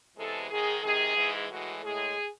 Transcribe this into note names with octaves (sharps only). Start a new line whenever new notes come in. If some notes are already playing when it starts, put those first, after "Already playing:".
E2 C3 E3 G#3 A4
G#2 D#3 G#3 G#4
C3 D#3 G#3 G#4
G#2 E3 G#3
A2 E3 G#3 F#4
A2 G#3 G#4